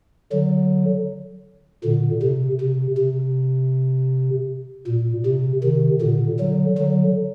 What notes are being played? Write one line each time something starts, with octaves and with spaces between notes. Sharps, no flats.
D3 F#3
A#2 D3
C3
C3
C3
A#2
C3
C3 D#3
A#2 D3
D3 F#3
D3 F#3